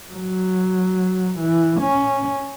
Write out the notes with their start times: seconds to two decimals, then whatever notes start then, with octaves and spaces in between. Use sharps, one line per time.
0.12 F#3
1.39 E3
1.81 C#4